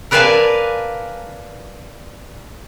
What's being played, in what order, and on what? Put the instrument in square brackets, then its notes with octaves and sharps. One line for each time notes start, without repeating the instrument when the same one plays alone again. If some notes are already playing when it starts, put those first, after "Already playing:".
[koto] A#4 B4 D5 F5 G#5 A5